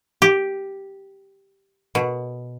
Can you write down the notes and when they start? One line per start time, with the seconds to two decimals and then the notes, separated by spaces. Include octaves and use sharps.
0.22 G4
1.95 B2